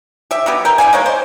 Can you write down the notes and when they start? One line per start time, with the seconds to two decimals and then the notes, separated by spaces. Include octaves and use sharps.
0.31 G4 E5
0.46 F#3 B3 G4
0.65 A#4 G5
0.78 E3 D5 F5 G#5
0.93 G#3 A#3 C#5
1.06 C5